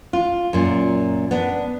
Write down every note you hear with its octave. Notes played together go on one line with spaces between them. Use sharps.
F4
F#2 A#2
B3 D4